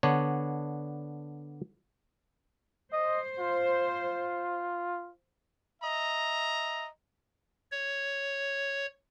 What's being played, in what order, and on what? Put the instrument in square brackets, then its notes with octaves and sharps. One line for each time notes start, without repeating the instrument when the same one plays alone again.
[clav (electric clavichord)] D3 B3 D4 C#5
[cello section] C5 [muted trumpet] D#5
[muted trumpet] F4
[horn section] D#5 E5 A#5
[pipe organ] C#5